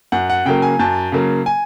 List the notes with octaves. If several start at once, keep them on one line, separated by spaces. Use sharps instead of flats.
F#2 F#5
F#5
C#3 F#3 A#3 G5
G#5
F#2 A5
C#3 F#3 A#3
G#5